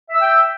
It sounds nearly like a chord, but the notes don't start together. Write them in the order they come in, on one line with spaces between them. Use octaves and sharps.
E5 E6 G5